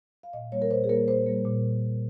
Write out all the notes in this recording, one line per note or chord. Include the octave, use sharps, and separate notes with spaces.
F5
A#2 D#5
G3 A#3 C#5
A#4
A#2 C5
G#4
G3 A#3 A#4
A#2 C5
G3 A#3
A#2